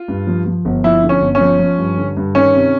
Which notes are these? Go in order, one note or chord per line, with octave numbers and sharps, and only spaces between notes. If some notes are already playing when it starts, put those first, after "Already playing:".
Already playing: F4
G2
F3
F3
G1
F3 E4
D3
C#4
G1
C#4
F3
F3
G2
D3
G2
D#3 C#4
C3